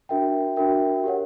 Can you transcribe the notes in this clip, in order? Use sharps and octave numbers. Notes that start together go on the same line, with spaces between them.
D4 F#4 A#4 E5 G5
D4 F#4 A#4 E5 G5
G4 A#4 C#5 F#5